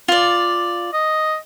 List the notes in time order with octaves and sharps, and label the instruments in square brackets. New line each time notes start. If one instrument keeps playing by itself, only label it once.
[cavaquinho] F4 D5
[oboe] D#5